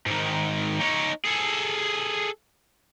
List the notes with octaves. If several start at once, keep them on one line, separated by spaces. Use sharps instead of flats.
G#2 D#3
D#4 C#5
G#4 A4